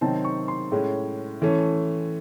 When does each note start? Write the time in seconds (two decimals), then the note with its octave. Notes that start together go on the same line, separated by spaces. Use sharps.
0.01 C3 D#3 F#3 C4 D#4 A5
0.25 C#6
0.48 C6
0.72 A2 G#3 C#4
1.42 E3 A3 C#4